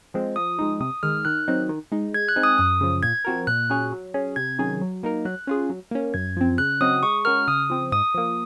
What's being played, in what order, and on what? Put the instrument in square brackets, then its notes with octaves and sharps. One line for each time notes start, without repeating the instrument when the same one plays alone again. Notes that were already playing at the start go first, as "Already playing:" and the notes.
[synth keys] F3 G#3 C4
[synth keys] F3 [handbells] D#6
[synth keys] G#3 D#4
[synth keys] C3 [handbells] D#6
[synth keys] D#3 G#3 [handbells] F6
[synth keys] D#3 [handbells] F#6
[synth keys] F#3 C4 D#4
D#3
G#3 D#4
[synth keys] G#3 [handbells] G#6
[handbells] F#6
[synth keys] C4 D#4 G#4
[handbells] D#6
[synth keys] F#2 [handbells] D#6
[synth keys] C#3 F3
[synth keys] A#2 [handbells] G#6
[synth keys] F3 C4 F#4 A#4
[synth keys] A#2 [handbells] F#6
[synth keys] F#3 C#4 G#4 C#5
F#3
C#4 G#4
[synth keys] C3 [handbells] G#6
[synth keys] D#3 F#3 C#4 G#4
F#3
A#3 D#4 A#4
[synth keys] F#3 [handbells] F#6
[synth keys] C#4 F4 G#4
F#3
A#3 C#4
[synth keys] F#2 [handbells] G#6
[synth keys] F3 C4
[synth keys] C#3 [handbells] F#6
[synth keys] F#3 C4 D#4 F#4 [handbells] D#6
[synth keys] G#3 [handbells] C#6
[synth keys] C#4 F#4 A#4 [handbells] F6
[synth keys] C#3 [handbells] D#6
[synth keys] F3 C4
[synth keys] G#2 [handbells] D#6
[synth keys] F3 A#3